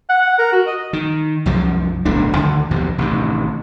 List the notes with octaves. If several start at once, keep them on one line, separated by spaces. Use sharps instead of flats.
F#5
F#5
A#4
F#4
D#5
D#3
C2 F#2 F3
D1 B1 A3 D4
D2 D3 D#3
A#1 E2 G2 C3
A1 C3 D#3